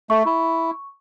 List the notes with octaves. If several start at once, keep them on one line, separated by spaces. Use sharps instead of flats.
A3 C#6
E4